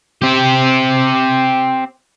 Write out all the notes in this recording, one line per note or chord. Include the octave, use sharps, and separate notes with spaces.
C4 G4